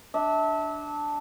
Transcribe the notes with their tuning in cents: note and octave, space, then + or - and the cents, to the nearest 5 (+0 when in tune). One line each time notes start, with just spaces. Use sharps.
D4 +0 E5 -30